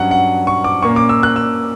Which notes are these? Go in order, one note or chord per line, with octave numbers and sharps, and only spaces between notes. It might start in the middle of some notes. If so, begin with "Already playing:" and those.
Already playing: G2 F#3 C#4 F#5
F#5
C#6
D6
A#2 A#3 C#4 C#6
D6
E6
F#6
E6